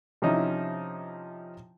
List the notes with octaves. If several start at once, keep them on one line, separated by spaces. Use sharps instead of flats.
C3 F3 C#4 D#4 E4